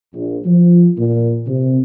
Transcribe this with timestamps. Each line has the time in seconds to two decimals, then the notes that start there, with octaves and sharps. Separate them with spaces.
0.15 A#1
0.45 F3
0.98 A#2
1.47 C3